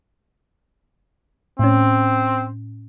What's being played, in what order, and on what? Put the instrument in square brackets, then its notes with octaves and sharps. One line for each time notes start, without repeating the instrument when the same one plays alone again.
[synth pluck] A2 C#4 [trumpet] C4